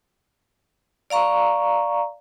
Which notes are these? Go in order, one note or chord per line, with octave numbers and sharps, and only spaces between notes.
D5 F5 A#5 C#6